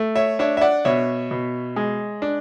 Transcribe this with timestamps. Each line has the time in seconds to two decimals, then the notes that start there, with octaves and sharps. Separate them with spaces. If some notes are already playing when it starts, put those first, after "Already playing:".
Already playing: A3
0.15 C#5 E5
0.39 D4 C#5 E5
0.57 E5
0.61 D5 F#5
0.85 B2 C#5 E5
1.31 B2
1.76 G#3
2.22 D4